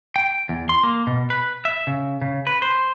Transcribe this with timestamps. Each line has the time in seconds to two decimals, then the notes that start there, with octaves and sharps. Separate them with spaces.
0.16 G5
0.49 E2
0.69 C6
0.83 A#3
1.07 B2
1.30 B4
1.65 E5
1.87 C#3
2.22 C#3
2.47 B4
2.62 C5